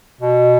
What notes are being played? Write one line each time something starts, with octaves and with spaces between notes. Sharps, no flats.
B2